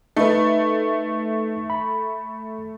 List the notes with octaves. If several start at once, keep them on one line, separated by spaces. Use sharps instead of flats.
A3 D#4 B4
B5